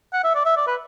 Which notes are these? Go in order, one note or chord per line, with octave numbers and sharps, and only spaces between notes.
F#5
E5
D5
E5
D5
B4